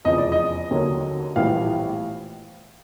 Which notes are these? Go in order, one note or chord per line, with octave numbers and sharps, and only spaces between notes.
F1 E2 C#3 F3 D#5
D5
D#5
D#2 D3 F#3 A#3 C#4
A#1 A2 E3 G3 B3 F5